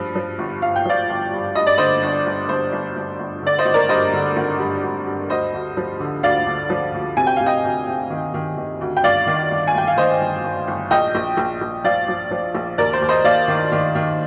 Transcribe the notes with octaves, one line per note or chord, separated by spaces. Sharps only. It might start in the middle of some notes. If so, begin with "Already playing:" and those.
Already playing: G2 F3
F3
G1
G2 F5
G5
F3 D5 F5
G1
G2
G2 D#5
D5
D3 C5 D#5
G1
G1
G1 C5
G1
G1
G1
D3 D5
C5 D#5
G#1
A#4 D5
G2 C5 D#5
D3
G#1
G2
G2
G2
D2 C5 D#5
D2
F3
D3
D2 D5 F5
D3
F3
D2
C3 G#5
G5
C3 F5
D#5 G5
D2
C3
D#3
D#3
D#3
D2
G5
G1 D5 F5
D#3
G1
G#5
G1 G5
F5
D#3 C5 D#5
G1
D#3
G1
A#1 D#5 G5
A#1
A#1
A#1
F3 D5 F5
F3
F3
A#1
D#2 A#4 D5
C5
D#2
C5 D#5
D#2 D5 F5
D#3
D#3
D#3